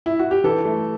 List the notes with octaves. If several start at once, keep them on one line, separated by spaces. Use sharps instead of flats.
E4
F#4
G4
E3 A4
A3